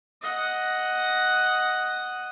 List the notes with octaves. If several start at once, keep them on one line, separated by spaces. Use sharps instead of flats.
D#5 F#5